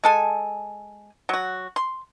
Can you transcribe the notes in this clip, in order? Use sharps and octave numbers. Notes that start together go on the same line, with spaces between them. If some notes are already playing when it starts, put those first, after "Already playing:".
G#3 A4 G#5
F#3 F#4
C6